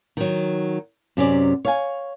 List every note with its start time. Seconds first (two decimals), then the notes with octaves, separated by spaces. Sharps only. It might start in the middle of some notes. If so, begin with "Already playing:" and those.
0.17 D#3 F#3
1.17 F#2 C3 C#4 D5
1.65 C#5 F5 G#5